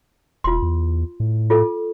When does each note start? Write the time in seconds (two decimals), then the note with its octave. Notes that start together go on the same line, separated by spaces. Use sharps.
0.44 E1 F4 C6
0.62 E2
1.20 A2
1.50 F4 A4